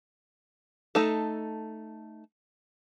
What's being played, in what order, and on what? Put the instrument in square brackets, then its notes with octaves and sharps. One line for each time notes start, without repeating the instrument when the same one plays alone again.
[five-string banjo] A3 D#4 A4